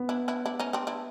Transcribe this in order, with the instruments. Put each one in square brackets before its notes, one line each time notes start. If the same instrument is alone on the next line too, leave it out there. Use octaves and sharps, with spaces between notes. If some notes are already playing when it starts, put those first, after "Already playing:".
Already playing: [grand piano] B3
[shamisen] D4 E4
D4 E4
D4 E4
C#4 D#4
C4 D4
D4 E4